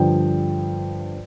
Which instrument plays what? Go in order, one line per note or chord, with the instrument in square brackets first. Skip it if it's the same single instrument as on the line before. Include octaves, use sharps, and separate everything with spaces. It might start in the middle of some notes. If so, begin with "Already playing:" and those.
Already playing: [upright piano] G2 D3 F3 G5